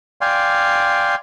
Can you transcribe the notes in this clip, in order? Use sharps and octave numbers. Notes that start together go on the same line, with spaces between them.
D5 F5 G5 G#5 C6